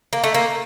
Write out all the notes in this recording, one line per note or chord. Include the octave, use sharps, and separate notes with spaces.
A#3
A3
A#3